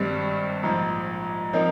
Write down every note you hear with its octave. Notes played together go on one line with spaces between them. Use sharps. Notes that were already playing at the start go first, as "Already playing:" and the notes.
Already playing: G#1 G2 G3 C4 G4
A#1 G#2 F3
F3 C4 D#4 A#4